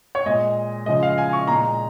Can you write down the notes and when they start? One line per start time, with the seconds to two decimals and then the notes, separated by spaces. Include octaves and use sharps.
0.15 C#5
0.26 A#2 G#3 D#5
0.86 C#3 F3 G#3 D#5
1.03 F5
1.18 G#5
1.33 C#6
1.47 A#2 G#3 A#5